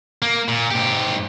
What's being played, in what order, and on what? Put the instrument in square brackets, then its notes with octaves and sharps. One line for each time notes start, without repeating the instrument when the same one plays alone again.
[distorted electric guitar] A#3
A#2
G#2 G4